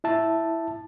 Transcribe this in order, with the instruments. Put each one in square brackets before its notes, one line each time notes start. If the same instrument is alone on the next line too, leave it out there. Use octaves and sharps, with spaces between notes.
[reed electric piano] E4 E5 A5